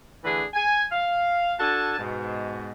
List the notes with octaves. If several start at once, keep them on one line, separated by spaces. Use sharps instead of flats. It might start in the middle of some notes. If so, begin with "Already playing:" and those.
D3 E3 A3 D4 G#4 B4
G#5
F5
D4 F#4 A4 G#5 A5
G#2 B2